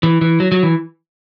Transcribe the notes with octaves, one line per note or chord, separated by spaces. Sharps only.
E3
E3
F#3
F#3
E3